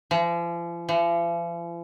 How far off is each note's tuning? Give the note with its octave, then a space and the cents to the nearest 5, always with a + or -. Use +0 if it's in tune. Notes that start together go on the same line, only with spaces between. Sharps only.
F3 -40
F3 -45